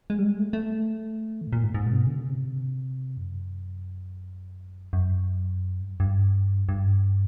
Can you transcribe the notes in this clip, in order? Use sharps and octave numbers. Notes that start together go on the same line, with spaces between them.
G#3
G3
G#3
A3
A3
D#3
A2
A#2
G#2
G#2
A#2
C3
B2
D3
C#3
C3
F#2
F#2
G2
F#2
G2
G2